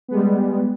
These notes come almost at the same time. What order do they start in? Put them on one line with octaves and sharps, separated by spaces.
B3 G#3 G3